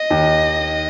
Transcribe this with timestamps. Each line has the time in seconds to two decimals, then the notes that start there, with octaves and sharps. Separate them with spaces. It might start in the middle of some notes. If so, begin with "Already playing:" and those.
Already playing: D#5
0.10 D#2